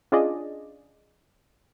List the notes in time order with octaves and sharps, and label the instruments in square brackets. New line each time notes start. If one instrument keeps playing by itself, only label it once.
[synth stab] C#4 D4 F4 G#4 D5 D#5